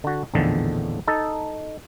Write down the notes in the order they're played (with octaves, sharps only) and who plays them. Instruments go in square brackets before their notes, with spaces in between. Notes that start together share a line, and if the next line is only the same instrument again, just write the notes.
[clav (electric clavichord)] D3 F#4
A#1 E2 A2 D3 D#3 F3
D#4 A4